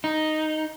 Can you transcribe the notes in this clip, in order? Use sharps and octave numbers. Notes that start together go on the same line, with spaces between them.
D#4